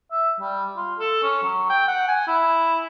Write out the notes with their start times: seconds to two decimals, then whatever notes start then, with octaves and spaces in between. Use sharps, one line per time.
0.11 E5
0.40 G3
0.77 F4
0.99 A4
1.23 C#4
1.43 F#3
1.69 G5
1.88 F#5
2.08 G#5
2.27 E4